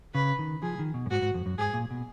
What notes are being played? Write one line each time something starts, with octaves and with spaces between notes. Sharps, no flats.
C#3 B4
D#3
F3 G#4
D#3
B2
F#2
G#2 F#4
G#2
F2
F#2
G#2 G#4
A#2
B2